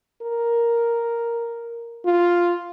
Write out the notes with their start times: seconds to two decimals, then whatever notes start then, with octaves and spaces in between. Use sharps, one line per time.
0.22 A#4
2.05 F4